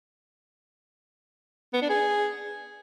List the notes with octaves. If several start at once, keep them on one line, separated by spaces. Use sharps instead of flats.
B3
D4
G#4